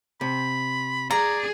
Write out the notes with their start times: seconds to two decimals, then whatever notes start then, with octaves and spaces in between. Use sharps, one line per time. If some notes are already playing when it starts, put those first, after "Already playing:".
0.21 C3 B5
1.11 G#4 D5 A#5